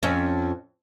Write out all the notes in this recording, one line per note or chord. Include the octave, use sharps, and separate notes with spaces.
F2 C#4